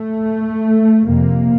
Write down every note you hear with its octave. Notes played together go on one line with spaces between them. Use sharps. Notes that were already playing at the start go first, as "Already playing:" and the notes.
Already playing: A3
F2 C3 A#3